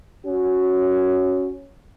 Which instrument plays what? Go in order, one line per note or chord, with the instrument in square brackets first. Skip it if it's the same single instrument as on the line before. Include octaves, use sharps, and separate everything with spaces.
[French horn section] C#4 F#4